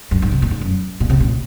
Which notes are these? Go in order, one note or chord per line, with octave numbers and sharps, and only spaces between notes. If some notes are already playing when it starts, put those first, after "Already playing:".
F#2
G#2
C3
A#2
G#2
F#2
A#2
C3
A#2